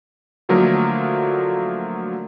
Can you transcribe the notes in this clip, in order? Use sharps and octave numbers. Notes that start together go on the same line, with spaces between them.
D3 F3 F#3 A3 A#3 A#4